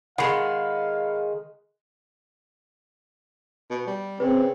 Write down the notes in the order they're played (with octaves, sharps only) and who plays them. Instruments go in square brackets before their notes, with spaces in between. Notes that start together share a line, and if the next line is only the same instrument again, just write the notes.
[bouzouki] D#3 G#3 [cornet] F5 [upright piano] F#5 B5 C7
[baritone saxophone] B2
G3
[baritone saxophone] C#3 [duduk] C4 [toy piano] B4